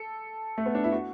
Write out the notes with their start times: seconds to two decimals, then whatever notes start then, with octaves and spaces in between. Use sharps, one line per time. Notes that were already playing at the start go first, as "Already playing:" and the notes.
Already playing: A4
0.58 A3
0.66 B3
0.75 D4
0.84 E4
0.92 F#4